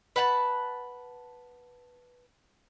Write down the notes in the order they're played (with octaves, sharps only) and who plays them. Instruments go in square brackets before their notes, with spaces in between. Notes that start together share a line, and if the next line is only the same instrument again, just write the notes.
[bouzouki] B4 F#5 G5 A5